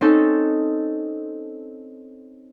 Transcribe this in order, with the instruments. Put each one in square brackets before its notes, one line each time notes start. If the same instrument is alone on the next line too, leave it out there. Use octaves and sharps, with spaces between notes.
[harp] C4 C#4 D#4 A4